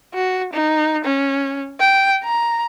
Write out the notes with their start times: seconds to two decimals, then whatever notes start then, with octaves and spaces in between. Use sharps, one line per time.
0.14 F#4
0.53 D#4
1.05 C#4
1.80 G5
2.24 A#5